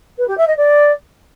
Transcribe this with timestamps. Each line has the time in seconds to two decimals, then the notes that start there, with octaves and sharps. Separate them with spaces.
0.18 B4
0.28 G4
0.37 E5
0.47 D#5
0.57 D5